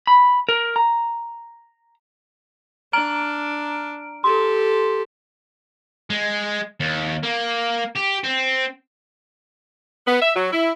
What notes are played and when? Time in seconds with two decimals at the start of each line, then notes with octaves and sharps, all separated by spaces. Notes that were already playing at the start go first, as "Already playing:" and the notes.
0.07 B5
0.49 A#4
0.76 A#5
2.93 D4 A#5 F6 D7
4.24 G4 A4 C6
6.10 G#3
6.80 D#2
7.23 A#3
7.95 G4
8.24 C4
10.07 B3
10.21 E5
10.36 F#3
10.52 E4